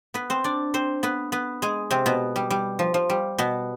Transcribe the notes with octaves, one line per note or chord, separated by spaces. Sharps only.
B3 B4
C4 C5
D4 D5
C4 C5
B3 B4
B3 B4
G#3 G#4
C3 C4
B2 B3
G3
G3
F3
F3
G3
B2 B3